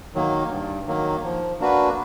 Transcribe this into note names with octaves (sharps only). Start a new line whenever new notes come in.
D#3 F#3 A#3
G2
D#3 F#3 A#3
F3
A#3 D4 F#4 B4